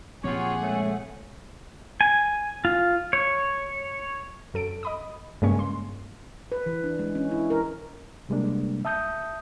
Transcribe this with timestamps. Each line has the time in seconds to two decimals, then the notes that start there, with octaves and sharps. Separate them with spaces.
0.24 A#2 F3 C4 F4 G4 G#4 C#5 F#5
0.61 G#3 A3 C#5
2.01 G#5
2.65 F4
3.13 C#5
4.54 F#2 A4 D7
4.83 D#5 B5 D#6
5.42 G2 C#3 G#3 A#3 C#4 C#6
5.59 C6
6.52 B4
6.66 E3
6.84 D4
6.99 G#3
7.15 C#4
7.31 E4
7.50 A#4
8.29 C3 G3 G#3 A#3 D4
8.85 E5 A5 D#6 G6